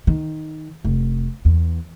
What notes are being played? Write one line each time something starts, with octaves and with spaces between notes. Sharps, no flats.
D#3
F1
E2